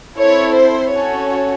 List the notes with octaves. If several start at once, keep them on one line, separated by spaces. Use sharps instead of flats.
C4 E4 A4 C#5
C5
C#4 F#4 A4 C#5